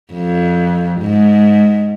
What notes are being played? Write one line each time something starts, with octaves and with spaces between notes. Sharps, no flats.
F2
G#2